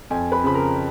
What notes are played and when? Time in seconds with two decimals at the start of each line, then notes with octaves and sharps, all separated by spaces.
0.10 F2 G#5
0.32 B4 B5
0.44 C#3 F3 B5
0.55 A#4 A#5